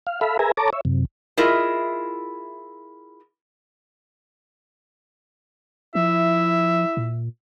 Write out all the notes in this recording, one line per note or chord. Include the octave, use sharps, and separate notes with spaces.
F5
A4 E5 F5 B5
G#4 A#4 B4 E5 G#5 A#5
A4 C#5 A5 A#5 D6
C#5 E5
F#2 C3
E4 F4 G#4 A#4 D#5 E5
F3 E4 E5
A#2